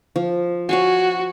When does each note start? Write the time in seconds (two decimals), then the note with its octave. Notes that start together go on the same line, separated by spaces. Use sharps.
0.16 F3
0.69 F#4 C#5 F5 G#5